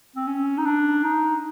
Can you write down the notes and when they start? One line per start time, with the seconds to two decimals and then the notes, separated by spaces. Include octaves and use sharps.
0.16 C4
0.27 C#4
0.58 D#4
0.65 D4
1.04 D#4